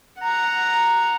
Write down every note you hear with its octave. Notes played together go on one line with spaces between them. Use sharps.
F#5 A#5